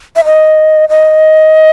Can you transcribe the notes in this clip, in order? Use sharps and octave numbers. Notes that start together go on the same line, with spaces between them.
E5
D#5
D#5